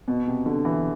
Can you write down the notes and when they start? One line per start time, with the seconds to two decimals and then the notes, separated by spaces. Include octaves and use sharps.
0.08 B2
0.28 C3
0.46 D3
0.65 E3